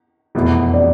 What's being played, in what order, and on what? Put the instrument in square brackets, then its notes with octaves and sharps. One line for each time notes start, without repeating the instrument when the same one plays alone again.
[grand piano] F1 E2 B2 B3 E4
[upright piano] D5